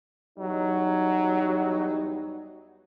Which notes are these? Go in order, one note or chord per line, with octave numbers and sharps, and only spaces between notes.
E2 F#3 G3 D#4